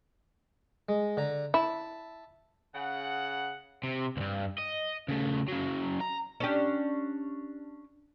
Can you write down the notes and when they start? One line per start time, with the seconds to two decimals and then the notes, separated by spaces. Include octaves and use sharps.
0.89 G#3
1.17 D3 A#5
1.54 E4 E5 A5
2.75 C#3 F#5
3.83 C3
4.17 C#2 G2
4.58 D#5
5.08 C#3 A3
5.48 C#3 F#3
6.01 A#5
6.40 C#4 D4 G4